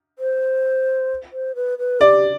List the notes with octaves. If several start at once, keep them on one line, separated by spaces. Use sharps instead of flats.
C5
C5
B4
B4
G4 D5